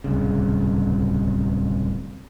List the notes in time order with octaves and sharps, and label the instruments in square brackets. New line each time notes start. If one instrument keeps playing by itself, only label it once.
[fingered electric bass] D1 C2 C#3